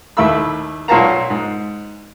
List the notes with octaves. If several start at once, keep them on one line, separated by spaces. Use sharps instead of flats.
D#2 A3 E4 E5 B5 E6
B1 A#2 C#5 F5 A5 A#5
G#2